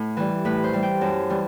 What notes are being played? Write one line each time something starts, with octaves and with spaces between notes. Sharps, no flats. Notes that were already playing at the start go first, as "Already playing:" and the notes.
Already playing: A2 B4
E3 G3
A2 B4
C5
E3 G3
G5
F#2 A5
E3 G3